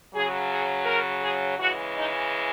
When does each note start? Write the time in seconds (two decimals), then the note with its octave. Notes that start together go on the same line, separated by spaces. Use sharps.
0.13 C#3 F#3 G#4
0.49 G#4
0.86 A#4
1.22 G#4
1.58 C#3 E3 G#3 F#4
1.94 D#4